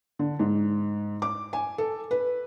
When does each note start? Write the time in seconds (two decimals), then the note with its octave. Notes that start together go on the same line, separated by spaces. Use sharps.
0.19 D3
0.39 G#2
1.22 D6
1.53 G#5
1.78 A4
2.11 B4